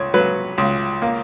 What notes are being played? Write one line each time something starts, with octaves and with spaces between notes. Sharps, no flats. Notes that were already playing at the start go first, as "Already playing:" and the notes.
Already playing: C#2 C#5
F#3 B4
C#2
A#3